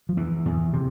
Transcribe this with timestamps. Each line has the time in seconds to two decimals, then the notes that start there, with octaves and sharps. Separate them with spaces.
0.09 F3
0.17 E2 E3
0.45 E2
0.73 C3